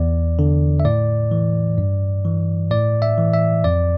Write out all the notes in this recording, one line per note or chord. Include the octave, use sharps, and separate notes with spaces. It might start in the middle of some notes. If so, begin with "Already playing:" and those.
Already playing: E2 D5
D3
E5
A2 D5
E3
G2
E3
A2 D5
E5
E3
E5
F2 D5